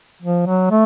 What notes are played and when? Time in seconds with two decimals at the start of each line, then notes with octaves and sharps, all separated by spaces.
0.22 F3
0.46 F#3
0.70 A3